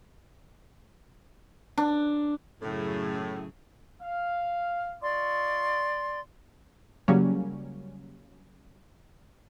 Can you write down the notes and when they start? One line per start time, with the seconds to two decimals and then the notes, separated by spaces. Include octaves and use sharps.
1.78 D4
2.62 F#2 A2 C#3 G#4
4.01 F5
5.02 F4 D5 D#5 C6 C#6
7.08 C#3 F#3 G3 A#3 C#4